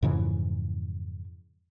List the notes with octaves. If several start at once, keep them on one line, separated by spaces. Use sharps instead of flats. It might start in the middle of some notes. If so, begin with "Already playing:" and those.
F2 G#2 C#3 E3